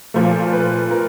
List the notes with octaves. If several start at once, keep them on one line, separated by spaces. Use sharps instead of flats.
A#2 F3 A3
B4
A#4